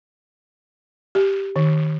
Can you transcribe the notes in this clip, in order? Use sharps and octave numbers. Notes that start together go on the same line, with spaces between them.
G4
D#3